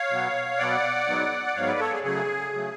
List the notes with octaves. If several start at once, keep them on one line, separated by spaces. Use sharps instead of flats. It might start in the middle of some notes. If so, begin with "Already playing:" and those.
Already playing: C#5 F5
B2 F#3 B3
B2 F#3 B3 D5 F#5
G#2 F#3 B3
D5
G#2 F#3 B3 C#5 F5
B4 D5
A4 C#5
G#4
C#3 F#3 A3 G#4
C#3 F#3 A3